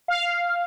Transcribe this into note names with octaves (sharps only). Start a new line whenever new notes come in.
F5